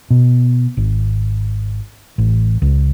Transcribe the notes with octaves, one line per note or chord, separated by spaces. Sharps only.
B2
G#1
A1
C#2